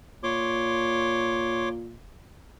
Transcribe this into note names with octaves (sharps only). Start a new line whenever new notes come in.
A#2 C#5 C6 D6